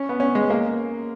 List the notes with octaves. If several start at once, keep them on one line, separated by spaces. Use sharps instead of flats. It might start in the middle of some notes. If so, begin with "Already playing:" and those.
Already playing: C#4
B3
C#4
G#3
A#3